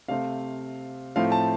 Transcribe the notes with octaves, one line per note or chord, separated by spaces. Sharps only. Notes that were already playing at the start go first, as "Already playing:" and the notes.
C3 A3 C4 F5
A2 F3 A3 C4 F5
A5